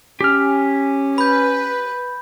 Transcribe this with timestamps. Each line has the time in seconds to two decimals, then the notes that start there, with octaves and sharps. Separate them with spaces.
0.21 C#4 G4 F6
1.18 B4 B5 G6